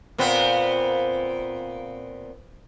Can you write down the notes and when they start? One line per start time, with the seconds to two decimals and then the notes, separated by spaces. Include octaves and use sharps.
0.18 A#2 B3 C4